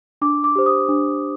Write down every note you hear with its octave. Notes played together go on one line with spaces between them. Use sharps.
D4 D6
D6
G4 C5
D#6
D4